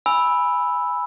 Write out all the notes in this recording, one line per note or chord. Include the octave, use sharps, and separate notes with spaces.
G#5 B5 E6